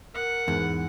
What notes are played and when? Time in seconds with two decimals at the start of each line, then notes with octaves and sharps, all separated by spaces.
0.15 A#4 F#5
0.48 E2 G#2